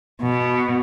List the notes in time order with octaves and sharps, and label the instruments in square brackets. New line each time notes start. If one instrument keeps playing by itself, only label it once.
[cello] B2